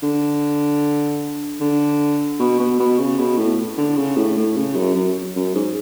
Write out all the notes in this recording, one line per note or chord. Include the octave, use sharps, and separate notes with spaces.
D3
D3
B2
B2
B2
C#3
B2
A2
D3
C#3
A2
A2
C#3
F#2
F#2
F#2
G#2